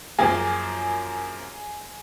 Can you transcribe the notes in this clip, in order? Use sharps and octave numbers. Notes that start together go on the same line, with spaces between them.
F#2 F3 A#3 G#4 G#5